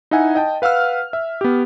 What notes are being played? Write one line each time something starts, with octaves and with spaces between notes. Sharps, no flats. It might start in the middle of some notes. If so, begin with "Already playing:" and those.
D#4 E4 E5 F#5 G#5
D#5 G5 A5
B4 F5 F#5 E6 F6
E5
B3 G4